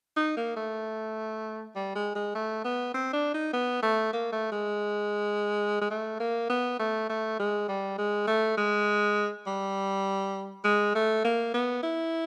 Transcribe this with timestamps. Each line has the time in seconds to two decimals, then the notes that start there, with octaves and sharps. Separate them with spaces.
0.17 D#4
0.37 A#3
0.56 A3
1.75 G3
1.95 G#3
2.15 G#3
2.35 A3
2.64 B3
2.94 C4
3.13 D4
3.34 D#4
3.53 B3
3.82 A3
4.13 A#3
4.32 A3
4.52 G#3
5.81 G#3
5.90 A3
6.20 A#3
6.49 B3
6.79 A3
7.09 A3
7.39 G#3
7.68 G3
7.98 G#3
8.27 A3
8.57 G#3
9.46 G3
10.64 G#3
10.95 A3
11.24 A#3
11.54 B3
11.83 E4